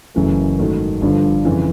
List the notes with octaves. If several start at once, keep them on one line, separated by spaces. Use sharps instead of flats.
F#1 F#2 C#3 E3 A3
G#2 D#3 F#3 A3
G1 G2 D3 F3
F2 C#3 E3